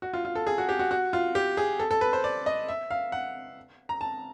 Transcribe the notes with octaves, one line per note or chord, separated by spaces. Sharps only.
F#4
F4
F4
A4
G#4
F#4
G4
F#4
F#4
F4
G4
G#4
A4
A4
B4
C5
D5
D#5
E5
F5
F#5
A#5
A5